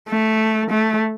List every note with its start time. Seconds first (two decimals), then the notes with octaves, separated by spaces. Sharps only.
0.09 A3
0.71 A3